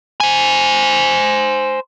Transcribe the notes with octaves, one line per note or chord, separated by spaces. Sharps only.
C5 G#5